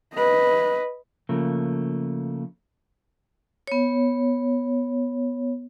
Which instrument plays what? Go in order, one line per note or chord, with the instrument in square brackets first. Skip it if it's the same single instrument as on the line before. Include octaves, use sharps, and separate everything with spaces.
[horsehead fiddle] B4 D#5
[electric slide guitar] C#3 F3 A3 A#3
[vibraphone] B3 C#5